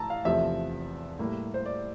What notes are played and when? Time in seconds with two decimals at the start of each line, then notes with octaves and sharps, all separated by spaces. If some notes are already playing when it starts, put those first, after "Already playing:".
Already playing: A2 E3 A5 A#5 E6
0.10 F5
0.25 E2 C3 F3 A3 E5
1.19 A2 G3 A#3
1.54 C5
1.66 D5